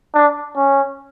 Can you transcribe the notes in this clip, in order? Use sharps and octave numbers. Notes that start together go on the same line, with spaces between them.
D4
C#4